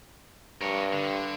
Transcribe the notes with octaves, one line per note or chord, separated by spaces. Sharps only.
G2 A#4 C#5
D3